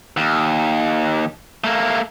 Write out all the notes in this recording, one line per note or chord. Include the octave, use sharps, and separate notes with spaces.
D#2
A3 A#3